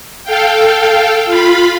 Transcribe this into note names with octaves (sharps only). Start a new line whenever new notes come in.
A4 F5 G5
F4 F5 B5